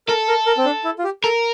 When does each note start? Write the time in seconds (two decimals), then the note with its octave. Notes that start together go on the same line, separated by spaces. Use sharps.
0.08 A4 A#4
0.28 A#4
0.46 A#4
0.57 C4
0.65 D4
0.84 E4
0.99 F4
1.04 G4
1.23 A4 A#4